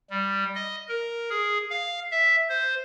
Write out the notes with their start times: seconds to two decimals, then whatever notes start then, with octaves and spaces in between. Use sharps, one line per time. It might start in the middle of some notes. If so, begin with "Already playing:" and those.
0.11 G3
0.55 D#5
0.89 A#4
1.30 G#4
1.70 F5
2.11 E5
2.50 C5